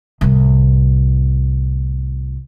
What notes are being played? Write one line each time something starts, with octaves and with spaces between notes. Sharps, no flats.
C2 A2